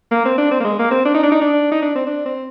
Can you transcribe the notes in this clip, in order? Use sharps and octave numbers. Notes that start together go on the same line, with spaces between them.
A#3
C4
D4
C4
A#3
G#3
A#3
C4
D4
D#4
D4
D#4
D4
D#4
D4
C4
D4
C4